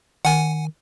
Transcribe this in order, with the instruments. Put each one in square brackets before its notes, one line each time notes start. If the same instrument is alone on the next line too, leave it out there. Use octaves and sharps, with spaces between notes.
[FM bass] D#3 [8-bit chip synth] F#5 G#5